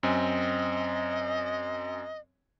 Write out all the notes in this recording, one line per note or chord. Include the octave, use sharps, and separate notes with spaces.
F#2 C4 D#5 G#5